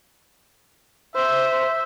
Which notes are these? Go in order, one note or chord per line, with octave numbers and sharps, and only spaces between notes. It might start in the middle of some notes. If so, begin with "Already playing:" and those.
C5 E5